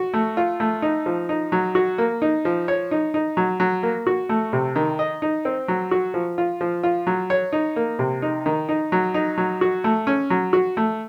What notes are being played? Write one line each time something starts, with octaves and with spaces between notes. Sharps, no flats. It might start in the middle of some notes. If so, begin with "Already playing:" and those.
Already playing: F#4
A3
F4
A3
D#4
F3
D#4
F#3
F#4
A#3
D#4
F3
C#5
D#4
D#4
F#3
F#3
A#3
F#4
A3
C3
D#3
D#5
D#4
C4
F#3
F#4
F3
F4
F3
F4
F#3
C#5
D#4
A#3
C3
D#4
D#3
D#4
F#3
D#4
F#3
F#4
A3
C#4
F#3
F#4
A3